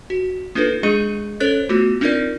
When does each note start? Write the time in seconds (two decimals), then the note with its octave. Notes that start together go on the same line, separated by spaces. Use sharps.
0.10 F#4
0.55 A#3 D4 D#4 F4 A4 B4
0.83 G#3 D4 G#4 D#5 C#7 D#7
1.40 C#4 A4 C5 C#5 F#6 A6
1.69 A3 B3 F4 F#4
2.01 C4 D4 D#4 F4 A#4 D5